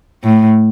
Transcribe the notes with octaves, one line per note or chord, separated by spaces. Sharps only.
A2